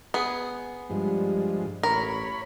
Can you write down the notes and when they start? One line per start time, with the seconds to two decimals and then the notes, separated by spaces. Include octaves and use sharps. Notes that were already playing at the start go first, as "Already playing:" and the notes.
0.14 B3 G#4
0.90 G2 F3 G3 G#3
1.83 A1 A#4 C#5 B5